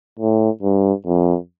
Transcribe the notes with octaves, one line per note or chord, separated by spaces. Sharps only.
A2
G2
F2